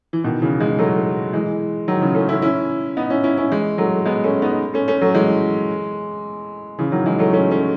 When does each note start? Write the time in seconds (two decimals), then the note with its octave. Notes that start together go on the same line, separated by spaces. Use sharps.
0.13 E3
0.24 B2 D#3
0.42 C#3 E3
0.60 E3 G#3
0.79 F#3 A3
1.33 E3 G#3
1.88 D#3 F#3
2.01 C#3 E3
2.15 A3 C#4
2.29 C#4 E4
2.42 C#4 E4
2.97 B3 D#4
3.10 C#4 E4
3.24 C#4 E4
3.38 C#4 E4
3.51 E3 G#3
3.78 F#3 A3
4.06 G#3 B3
4.24 A3 C#4
4.42 B3 D#4
4.74 A3 C#4
4.88 A3 C#4
5.01 F#3 A3
5.14 E3 G#3
6.78 C#3 E3
6.92 D#3 F#3
7.06 E3 G#3
7.19 F#3 A3
7.33 A3 C#4
7.51 A3 C#4